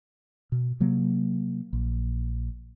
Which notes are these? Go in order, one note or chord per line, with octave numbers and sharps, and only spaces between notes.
B2
C3 F#3 A#3
A#1